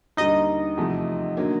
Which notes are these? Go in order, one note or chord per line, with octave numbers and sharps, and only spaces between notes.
D#2 D3 G3 D#4 D#5
E2 C3 F3 A3
D3 F#3 A#3